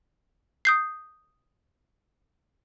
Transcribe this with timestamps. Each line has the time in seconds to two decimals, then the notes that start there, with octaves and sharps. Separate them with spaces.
0.65 D#6 G6 C7